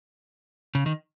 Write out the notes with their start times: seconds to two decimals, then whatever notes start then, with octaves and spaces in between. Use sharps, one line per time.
0.75 C#3
0.86 D#3